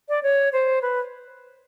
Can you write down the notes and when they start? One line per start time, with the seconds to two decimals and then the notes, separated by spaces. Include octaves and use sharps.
0.09 D5
0.23 C#5
0.53 C5
0.82 B4